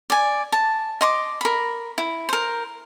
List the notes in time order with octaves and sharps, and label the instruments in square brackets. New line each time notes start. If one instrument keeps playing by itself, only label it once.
[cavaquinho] D5 G#5
A5
D#5 C6 D6
A#4 B5
E4
A#4 C5